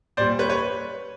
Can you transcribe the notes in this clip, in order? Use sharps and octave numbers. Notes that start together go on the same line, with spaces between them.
A#2 G3 C5 D5
B4 C#5
B4 C#5